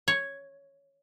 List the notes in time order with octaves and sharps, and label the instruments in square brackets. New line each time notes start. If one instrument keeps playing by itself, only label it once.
[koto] C#5